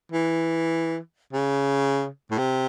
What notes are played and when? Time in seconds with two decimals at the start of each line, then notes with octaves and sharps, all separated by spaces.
0.12 E3
1.33 C#3
2.31 A2
2.38 C3